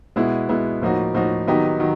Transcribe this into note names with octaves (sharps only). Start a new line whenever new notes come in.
B2 G#3 B3 E4
B2 G#3 B3 E4
A2 F3 A#3 D#4 F#4
A2 F3 A#3 D#4 F#4
D#3 F#3 B3 D#4 G4
D#3 F#3